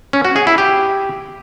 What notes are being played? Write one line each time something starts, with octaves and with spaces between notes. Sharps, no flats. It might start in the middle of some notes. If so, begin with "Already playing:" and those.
C#4
F#4
G#4
E4
G4